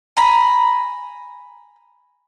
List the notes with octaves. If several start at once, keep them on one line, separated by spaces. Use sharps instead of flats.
G#5 A#5 B5